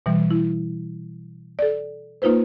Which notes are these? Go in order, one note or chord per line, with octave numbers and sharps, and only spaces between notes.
B2 E3 G3
E4
A4 D5
A#3 D#4 F4 B4 C5